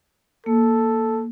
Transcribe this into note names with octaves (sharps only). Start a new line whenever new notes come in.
A#3 A4